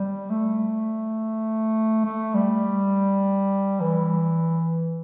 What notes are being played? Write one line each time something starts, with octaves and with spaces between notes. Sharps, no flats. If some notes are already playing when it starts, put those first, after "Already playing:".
Already playing: G3
A3
A3
G3
E3